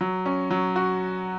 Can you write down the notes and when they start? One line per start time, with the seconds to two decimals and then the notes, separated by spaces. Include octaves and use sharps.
0.01 F#3
0.26 C#4
0.51 F#3
0.76 F#4